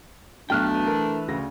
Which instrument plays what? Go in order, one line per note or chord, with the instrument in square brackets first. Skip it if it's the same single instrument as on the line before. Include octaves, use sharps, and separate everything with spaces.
[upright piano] B1 B2 F#3 [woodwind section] A3 D4 [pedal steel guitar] G5 F6 F#6
[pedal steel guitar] E3 B4
[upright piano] A#4
D2 C#3 A#6